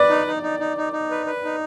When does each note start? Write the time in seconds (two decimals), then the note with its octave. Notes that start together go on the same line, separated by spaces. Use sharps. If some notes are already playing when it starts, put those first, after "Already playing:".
Already playing: B4 D5
0.10 D#4
0.27 D#4
0.43 D#4
0.59 D#4
0.77 D#4
0.93 D#4
1.11 B4
1.26 B4
1.44 D#4